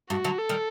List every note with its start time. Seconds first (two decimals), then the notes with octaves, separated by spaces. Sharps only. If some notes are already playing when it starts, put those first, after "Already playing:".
0.10 G2 F#4
0.24 D3 F#3
0.39 A4
0.49 D#3 G3